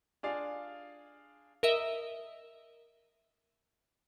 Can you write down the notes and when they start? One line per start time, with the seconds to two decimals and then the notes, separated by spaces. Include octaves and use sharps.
0.23 D4 F4 G#4 D5 F5
1.63 A#4 D#5 E5